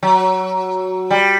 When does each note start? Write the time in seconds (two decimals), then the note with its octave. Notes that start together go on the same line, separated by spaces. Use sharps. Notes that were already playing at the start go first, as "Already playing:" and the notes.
0.03 F#3
1.11 G3